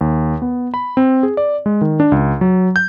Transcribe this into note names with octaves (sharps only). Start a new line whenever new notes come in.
D#2
B3
B5
C4
G#4
D5
G#3
D#3
D4
C#2
F#3
G6